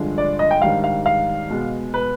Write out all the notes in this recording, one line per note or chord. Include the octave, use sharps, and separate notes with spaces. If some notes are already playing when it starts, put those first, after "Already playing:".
Already playing: G2 D3 F3 G#3 D4
D5
D#5
G5
G#2 D#3 G3 D4 F5
F5
F5
B2 G#3 B3
B4